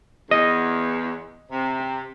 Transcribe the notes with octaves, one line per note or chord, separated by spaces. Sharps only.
E2 D#5
C3